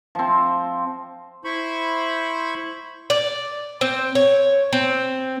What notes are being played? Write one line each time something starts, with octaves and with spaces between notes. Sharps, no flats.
F3 C4
E4 C5 B5 C#6
D5
C4
C#5
C4